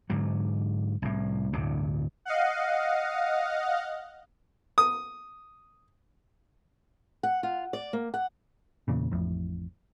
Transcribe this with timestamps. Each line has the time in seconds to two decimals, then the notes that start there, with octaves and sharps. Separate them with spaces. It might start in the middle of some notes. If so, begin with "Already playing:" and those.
0.10 G#2 D3 F#3
1.02 C2 A2
1.53 D1 D2 G2 C3
2.25 D#5 F5 F#5
4.78 D#6
7.23 F#5
7.43 F4
7.73 D5
7.93 A#3
8.14 F#5
8.88 E2 A#2 C#3
9.11 A1 F2 A2